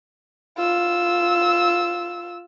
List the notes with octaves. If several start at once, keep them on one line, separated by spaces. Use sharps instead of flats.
F4 E6